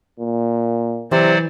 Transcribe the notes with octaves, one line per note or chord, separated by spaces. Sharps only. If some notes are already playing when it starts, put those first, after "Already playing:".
A#2
C3 E3 F#3 C5 D5